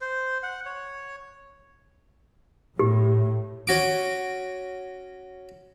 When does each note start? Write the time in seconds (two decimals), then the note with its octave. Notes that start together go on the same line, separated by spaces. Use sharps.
0.01 C5
0.43 F#5
0.66 C#5
2.79 A2 G4
3.67 C#4 F#4 D6